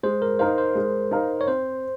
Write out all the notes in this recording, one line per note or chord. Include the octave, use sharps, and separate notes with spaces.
G#3 C5
A#4
D#4 A#4 C5 F5
C5
G#3
D#4 A#4 F5
C#5
C4 C5